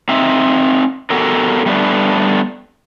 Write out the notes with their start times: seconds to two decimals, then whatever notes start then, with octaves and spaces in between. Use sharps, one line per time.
0.09 C4 D#4 E5
1.10 B3 F#4 G4 A4 A#4
1.66 G3 A3 B3 D4